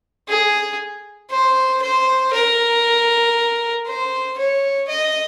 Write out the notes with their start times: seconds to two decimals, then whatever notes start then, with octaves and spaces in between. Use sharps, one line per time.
0.29 G#4
1.31 C5
1.82 C5
2.33 A#4
3.87 C5
4.38 C#5
4.88 D#5